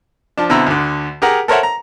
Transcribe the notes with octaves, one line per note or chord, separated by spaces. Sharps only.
F3 D4
B2 D3 C4 E4 A#5 E6
D2 D3
G4 G#4 A#4 F#5 A#5
A4 A#4 C5 C#5 E5 F#5
A#5